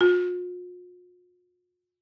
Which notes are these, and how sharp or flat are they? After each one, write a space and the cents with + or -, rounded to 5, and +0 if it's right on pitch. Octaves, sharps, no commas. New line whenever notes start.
F4 +45